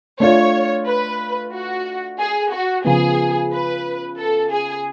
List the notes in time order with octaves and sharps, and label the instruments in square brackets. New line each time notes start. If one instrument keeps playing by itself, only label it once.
[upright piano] A3 D4 F4 [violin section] C#5
[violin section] B4
F#4
G#4
F#4
[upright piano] C#3 F3 B3 [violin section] G#4
[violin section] B4
A4
G#4